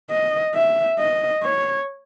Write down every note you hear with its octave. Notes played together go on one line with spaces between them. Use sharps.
D#5
E5
D#5
C#5